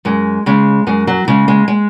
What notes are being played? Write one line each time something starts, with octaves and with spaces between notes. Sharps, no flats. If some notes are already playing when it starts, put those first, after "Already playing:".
F#2 G#3
C#3 G#3
F#2 G#3
F#3
C#3 G#3
G#3
G#3